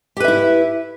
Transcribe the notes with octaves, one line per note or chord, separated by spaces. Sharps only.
E4 G4 B4 E5